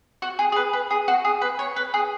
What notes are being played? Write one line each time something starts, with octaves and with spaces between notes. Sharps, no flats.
F#4
G#4
G#4
B4
B4
G#4
F#4
G#4
B4
C#5
B4
G#4